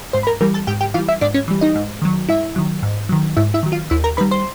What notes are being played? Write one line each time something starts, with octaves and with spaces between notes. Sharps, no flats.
G#2 C5 C6
B5
A#4 A#5
E3 G3 A#4 A#5
A4 A5
G#2 G4 G5
G4 G5
E3 G3 F4 F5
E4 E5
G#2 D4 D5
C#4 C#5
E3 G3
D#4 D#5
G#2
D#3 F#3
G#2 E4 E5
D#3 F#3
G#2
D#3 F#3
G#2 E4 E5
E4 E5
D#3 F#3
F4 F5
D#2 E4 E5
A#4 A#5
D#3 G3 B4 B5
C5 C6